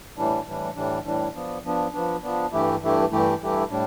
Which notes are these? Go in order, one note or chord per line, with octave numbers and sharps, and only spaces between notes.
A2 E3 G3 D4
A2 E3 G3 D4
A2 E3 G3 D4
A2 E3 G3 D4
F3 B3 D4
F3 B3 D4
F3 B3 D4
F3 B3 D4
G2 E3 A3 E4 G4
G2 E3 A3 E4 G4
G2 E3 A3 E4 G4
G2 E3 A3 E4 G4
A2 G3 D4